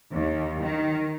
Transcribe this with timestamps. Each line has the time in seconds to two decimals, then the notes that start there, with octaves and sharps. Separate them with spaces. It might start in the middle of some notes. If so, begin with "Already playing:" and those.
0.14 D#2
0.62 D#3